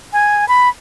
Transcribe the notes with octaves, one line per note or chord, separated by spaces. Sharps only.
G#5
B5